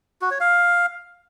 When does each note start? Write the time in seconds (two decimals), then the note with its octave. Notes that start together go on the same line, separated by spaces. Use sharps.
0.22 F#4
0.31 C#5
0.40 F5